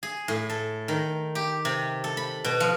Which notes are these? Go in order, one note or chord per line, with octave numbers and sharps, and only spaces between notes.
G#4
A2
A4
D#3
G4
C3
A4
B5
B2
F3